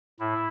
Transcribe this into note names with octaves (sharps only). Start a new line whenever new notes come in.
A2 E4